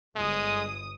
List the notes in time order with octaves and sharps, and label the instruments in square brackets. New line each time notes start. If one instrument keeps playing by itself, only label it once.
[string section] G1 D#6 [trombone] G#3